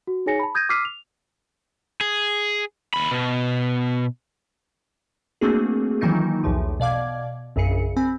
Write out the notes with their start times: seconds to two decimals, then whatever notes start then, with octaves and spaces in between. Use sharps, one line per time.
0.07 F#4
0.26 D#4 G#4 C#5 G#5 A#6 C#7
0.39 A5 B5
0.55 D#6 G6 G#6 A#6 D#7
0.69 D6 E6 F6 B6 C7 D#7
0.85 F7
2.01 G#4
2.94 D#2 B5
3.11 B2
5.41 A3 A#3 C4 D4 F#4 G#4
6.01 D#3 E3 F#3 A#3 D#4 F4
6.44 B1 E2 A2 E3 F3
6.80 B2 D5 F5 D6 G#6
7.56 A#1 F#2 C#3 G#4 C#7
7.96 C4 G#5 B5